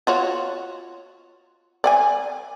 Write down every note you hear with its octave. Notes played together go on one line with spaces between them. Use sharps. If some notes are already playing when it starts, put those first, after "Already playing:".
F4 F#4 C#5
D5 F#5 G#5